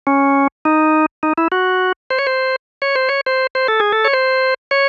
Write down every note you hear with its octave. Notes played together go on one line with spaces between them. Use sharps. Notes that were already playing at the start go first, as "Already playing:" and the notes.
C#4
D#4
D#4
E4
F#4
C5
C#5
C5
C#5
C5
C#5
C5
C5
A4
G#4
A4
C#5
C5
C#5